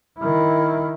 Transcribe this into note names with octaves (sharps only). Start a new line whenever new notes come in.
D#3 E4